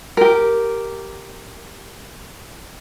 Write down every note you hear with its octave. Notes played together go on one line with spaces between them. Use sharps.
G4 A#4